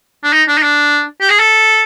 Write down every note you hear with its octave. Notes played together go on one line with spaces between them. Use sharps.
D4
D#4
D4
D#4
D4
G4
G#4
A4